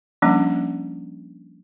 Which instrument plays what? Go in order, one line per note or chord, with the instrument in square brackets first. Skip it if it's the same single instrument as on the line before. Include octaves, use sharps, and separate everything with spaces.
[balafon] F3 G3 A#3 C#4 D4